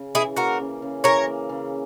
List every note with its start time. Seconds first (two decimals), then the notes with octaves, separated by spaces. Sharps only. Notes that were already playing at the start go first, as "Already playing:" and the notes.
Already playing: C#3
0.15 E3 E4 G#4
0.37 A#3 F#4 A#4
0.60 C#3
0.82 C#3
1.04 E3 A#4 C#5
1.27 A#3
1.49 C#3